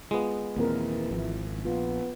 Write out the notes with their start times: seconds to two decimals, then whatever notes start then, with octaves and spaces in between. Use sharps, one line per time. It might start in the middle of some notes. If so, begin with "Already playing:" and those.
0.11 G#3 B3 F4
0.57 D#2 A#2 E3 A#3 C4 A#4
1.11 G#1 F3 E4
1.65 A#1 B3 F4